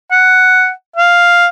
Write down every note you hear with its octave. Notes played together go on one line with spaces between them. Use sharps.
F#5
F5